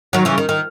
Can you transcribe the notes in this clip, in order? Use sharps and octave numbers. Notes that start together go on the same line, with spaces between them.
D#3 F#3
C#3 E3
D#3
D#3